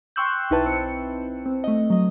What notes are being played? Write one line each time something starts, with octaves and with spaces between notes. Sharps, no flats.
G5 C6 C#6 E6 F#6 G6
B1 D#4 E4 B4 A5
C4 C#7
C4
A3 D#5
F#3 D#5